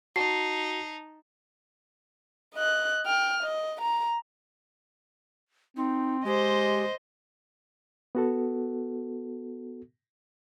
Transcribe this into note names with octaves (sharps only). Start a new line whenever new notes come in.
D#4 F#4 A5 C7
D#5 F#6
G5 F6
D#5
A#5
C4 D#4
G#3 G4 C5 D#5
B3 F#4 A4